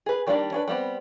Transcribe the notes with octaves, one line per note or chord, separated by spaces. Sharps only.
G#4 B4
D#3 G3 A#3 D4 D5
C#4 D4 B4
G3 B3 C4